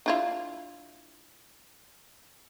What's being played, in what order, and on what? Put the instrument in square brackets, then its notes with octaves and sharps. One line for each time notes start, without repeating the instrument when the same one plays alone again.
[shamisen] D4 E4 F4